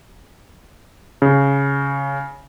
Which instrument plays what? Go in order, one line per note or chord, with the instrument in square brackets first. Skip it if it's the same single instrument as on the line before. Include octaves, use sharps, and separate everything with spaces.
[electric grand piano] C#3